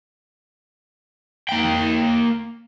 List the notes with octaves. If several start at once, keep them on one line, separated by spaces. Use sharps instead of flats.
A#3 G5